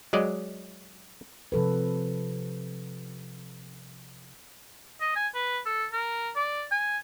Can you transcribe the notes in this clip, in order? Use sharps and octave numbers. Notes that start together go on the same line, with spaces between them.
F#3 G#3 D5 D#5
C3 F3 A4 B4
D#5
G#5
B4
A4
A#4
D5
G#5